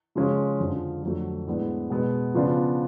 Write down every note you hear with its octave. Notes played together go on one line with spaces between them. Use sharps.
C#3 F3 G#3 C#4 F4
F2 D3 F3
F2 D3 F#3 A3
A2 G#3 B3 D4
B2 G#3 B3
C#3 F3 B3 D4 F4